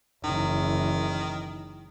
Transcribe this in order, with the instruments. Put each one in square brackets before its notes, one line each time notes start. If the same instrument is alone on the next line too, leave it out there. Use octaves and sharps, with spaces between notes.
[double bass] F#1 E3 [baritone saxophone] D#3